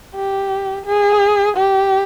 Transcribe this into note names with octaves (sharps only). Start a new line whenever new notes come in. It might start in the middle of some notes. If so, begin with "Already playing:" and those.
G4
G#4
G4